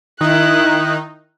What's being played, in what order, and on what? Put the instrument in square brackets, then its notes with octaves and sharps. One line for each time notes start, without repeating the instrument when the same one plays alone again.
[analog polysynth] D#3 D#4 [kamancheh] E4 F#6